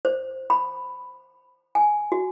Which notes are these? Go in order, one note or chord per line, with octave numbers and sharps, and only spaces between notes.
C5
B5
G#5
F#4